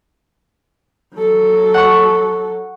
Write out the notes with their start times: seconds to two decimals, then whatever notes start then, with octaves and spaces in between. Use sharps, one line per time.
1.16 F#3 A4
1.74 F#5 C#6